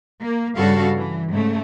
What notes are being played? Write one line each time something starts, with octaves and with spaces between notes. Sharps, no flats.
A#3
G2 C#3 G3 F#4 A4 F5
E3
G#2 C#3 A3